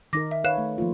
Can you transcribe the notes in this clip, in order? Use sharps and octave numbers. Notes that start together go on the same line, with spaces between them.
D#3 D#4 A#4 D6 A#6
E5
B4 C#5 F5 F#6 E7
A3
F3 A#3 F4